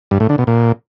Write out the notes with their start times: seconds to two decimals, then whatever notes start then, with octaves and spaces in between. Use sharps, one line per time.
0.11 G2
0.20 A2
0.29 D3
0.38 B2
0.47 A#2